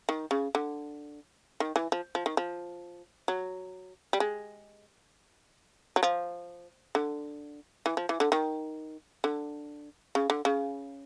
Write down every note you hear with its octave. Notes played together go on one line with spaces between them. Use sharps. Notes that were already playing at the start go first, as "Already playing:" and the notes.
D#3
C#3
D3
D#3
E3
F3
F3
D#3
F3
F#3
G3
G#3
F#3
F3
D3
E3
F3
E3
D3
D#3
D3
C#3
D3
C#3